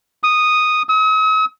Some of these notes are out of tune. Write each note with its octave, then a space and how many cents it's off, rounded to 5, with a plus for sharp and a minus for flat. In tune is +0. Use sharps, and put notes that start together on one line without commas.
D#6 -5
D#6 +45